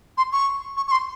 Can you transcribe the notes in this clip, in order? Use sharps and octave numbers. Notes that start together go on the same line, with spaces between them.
C6
C#6
C#6
C#6
C6